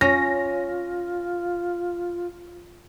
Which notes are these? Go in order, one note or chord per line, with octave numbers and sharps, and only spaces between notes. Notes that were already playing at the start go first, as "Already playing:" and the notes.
C#4 F4 A#6